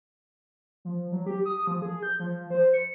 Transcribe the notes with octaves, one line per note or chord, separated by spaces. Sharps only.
F3
F#3
G4
D#6
F3
G#4
G6
F3
C5
C#7